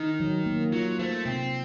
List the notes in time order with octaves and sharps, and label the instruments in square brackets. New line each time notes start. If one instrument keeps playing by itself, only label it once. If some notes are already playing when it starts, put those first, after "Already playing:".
Already playing: [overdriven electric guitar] D#3 [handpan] D#4
[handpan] F#3
A#3
[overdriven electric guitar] F#3 [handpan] F4
[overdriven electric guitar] A3 [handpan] C5
[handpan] C3 [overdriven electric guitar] C4